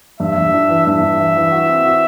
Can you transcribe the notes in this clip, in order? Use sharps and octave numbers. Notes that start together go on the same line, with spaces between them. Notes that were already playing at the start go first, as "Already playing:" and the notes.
G2 E5
G2
D4
E3
G2 E5
G2
E3
E3
F#4
C4
F#4